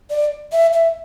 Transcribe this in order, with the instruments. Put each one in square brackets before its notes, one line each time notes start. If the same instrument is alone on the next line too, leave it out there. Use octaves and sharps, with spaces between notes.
[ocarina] D5
E5
E5